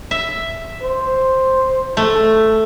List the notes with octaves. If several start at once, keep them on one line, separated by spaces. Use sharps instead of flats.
E5
C5
A3